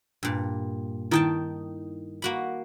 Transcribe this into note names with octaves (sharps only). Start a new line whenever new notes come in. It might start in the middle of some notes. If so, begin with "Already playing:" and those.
G2 A#2
D#3 D#4 E4 G5 A5 D#6
A#3 F#4 B5